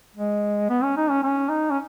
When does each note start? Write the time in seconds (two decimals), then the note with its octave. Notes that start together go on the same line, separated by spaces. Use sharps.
0.16 G#3
0.70 B3
0.83 C#4
0.97 D#4
1.10 C#4
1.23 C#4
1.50 D#4
1.71 C#4